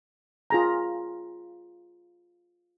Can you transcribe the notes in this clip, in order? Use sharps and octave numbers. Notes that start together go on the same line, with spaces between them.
F4 G#4 A#5